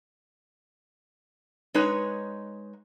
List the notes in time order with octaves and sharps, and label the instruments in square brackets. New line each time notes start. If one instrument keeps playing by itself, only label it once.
[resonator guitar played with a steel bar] G#3 D#4 B4 C#5